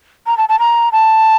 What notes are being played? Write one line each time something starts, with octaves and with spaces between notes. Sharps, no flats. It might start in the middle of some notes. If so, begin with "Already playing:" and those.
A#5
A5
A5
A#5
A5